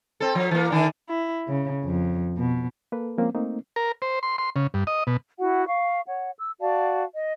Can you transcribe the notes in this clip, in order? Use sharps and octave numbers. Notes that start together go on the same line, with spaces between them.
C4 A4
F3
E3 A#3
D3 D#3 D4
E4
C#3
F2
B2
A#3 A4 B4
F3 G#3 A#3 C4 C#4
A3 A#3 C4 D#4
A#4
C5
C6
C6
C#3
G2
D#5
B2
E4 F#4 F#5
F5 C#6
C#5 F#5
E6
F#4 D5 F5 A5
D#5